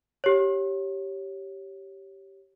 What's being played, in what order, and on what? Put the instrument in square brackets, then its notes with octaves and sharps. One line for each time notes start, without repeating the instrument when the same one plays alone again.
[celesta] G4 C#5